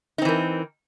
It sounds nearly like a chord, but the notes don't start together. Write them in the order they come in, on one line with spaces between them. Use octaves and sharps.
D#4 C4 E3 A#4